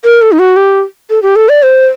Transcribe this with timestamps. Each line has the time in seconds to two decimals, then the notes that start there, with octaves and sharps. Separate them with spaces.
0.04 A#4
0.22 A4
0.32 D#4
0.39 F#4
0.56 G4
1.10 A4
1.23 G4
1.36 A4
1.49 D5
1.63 C5